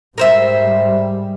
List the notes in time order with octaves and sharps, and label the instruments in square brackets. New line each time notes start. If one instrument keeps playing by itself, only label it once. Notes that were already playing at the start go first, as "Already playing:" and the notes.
[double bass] G#2 G3 [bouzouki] A#4 C5 E5